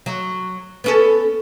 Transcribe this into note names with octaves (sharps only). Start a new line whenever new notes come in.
F#3
B3 C#4 A4